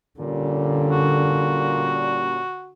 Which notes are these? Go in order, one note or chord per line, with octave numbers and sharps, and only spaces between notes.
A#2 D3 G3 C#4
F#4